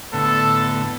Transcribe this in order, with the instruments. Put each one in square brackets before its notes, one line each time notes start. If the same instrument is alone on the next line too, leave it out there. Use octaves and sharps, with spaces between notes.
[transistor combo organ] A2 D3 B3 [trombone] A4